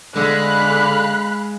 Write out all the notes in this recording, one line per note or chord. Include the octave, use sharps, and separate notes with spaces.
D3 G#3 F5 B5 F#6